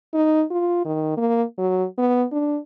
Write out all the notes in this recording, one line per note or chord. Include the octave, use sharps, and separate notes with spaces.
D#4
F4
D#3
A#3
F#3
B3
D4